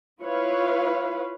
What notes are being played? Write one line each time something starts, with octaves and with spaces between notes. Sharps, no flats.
E4 F4 B4 C#5 F5